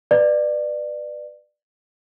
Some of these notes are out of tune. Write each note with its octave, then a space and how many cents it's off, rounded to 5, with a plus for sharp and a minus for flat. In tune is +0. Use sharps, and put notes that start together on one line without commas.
B4 +0 D5 +20